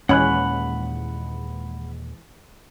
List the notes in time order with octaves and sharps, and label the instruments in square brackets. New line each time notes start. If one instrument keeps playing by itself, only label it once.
[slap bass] D#2 A#2 [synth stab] E3 G#3 [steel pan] C#4 [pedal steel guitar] F#5 B5 F#6